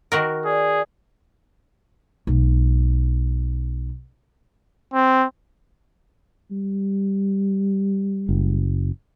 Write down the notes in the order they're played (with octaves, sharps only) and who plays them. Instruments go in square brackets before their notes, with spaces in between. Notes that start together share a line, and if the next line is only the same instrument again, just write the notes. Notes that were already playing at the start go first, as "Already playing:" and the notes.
[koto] D#3 F#4 A#4
[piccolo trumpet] G#4 [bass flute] D5
[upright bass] B1 G#3
[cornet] C4
[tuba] G3
[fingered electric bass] F#1